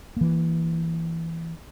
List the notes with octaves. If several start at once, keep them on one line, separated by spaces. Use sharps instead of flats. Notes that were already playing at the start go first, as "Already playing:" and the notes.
E3 A#3